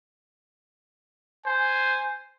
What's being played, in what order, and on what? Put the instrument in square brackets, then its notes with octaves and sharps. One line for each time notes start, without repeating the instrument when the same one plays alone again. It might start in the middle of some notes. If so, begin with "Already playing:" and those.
[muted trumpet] C5 [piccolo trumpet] G#5